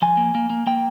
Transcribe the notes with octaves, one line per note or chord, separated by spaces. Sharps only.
F3 G#5
A#3
A#3
A#3
A#3 G5